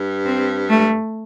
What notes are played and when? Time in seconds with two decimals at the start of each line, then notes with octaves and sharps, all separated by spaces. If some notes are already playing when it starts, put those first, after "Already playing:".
Already playing: G2
0.25 C4
0.70 A3